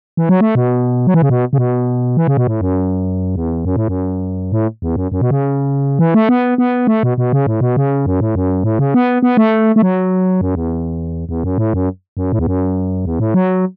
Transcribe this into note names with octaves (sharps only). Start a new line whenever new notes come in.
E3
F#3
A3
B2
F#3
E3
C#3
B2
C#3
B2
E3
C#3
B2
A2
F#2
E2
F#2
A2
F#2
A2
E2
F#2
F#2
B2
C#3
E3
A3
B3
B3
A3
B2
B2
C#3
A2
B2
C#3
F#2
A2
F#2
A2
C#3
B3
B3
A3
A3
F#3
F#2
E2
E2
F#2
A2
F#2
F#2
A2
E2
F#2
E2
A2
F#3